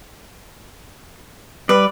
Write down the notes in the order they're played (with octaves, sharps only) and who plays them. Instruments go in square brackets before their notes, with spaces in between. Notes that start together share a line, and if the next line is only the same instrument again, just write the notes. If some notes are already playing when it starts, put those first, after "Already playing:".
[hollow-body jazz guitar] G3 [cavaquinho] B4 [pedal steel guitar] D5